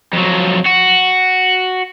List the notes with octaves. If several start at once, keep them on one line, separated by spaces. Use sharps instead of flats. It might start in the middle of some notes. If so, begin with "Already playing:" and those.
F2 F#3
F#4